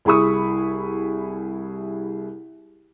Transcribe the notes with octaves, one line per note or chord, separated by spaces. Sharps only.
C2 E4 G#4 B5 C#6 D#6